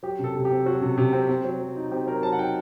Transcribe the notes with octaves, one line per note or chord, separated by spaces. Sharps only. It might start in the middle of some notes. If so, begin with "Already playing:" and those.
F#3 G4
C3
A4
C3
G4
C4
F#3 F#4
C3
C3
C4
C4
F#3
F#3
D#4
C4 G4
F#3 A#4
F#3 A5
F#5
D#4 G5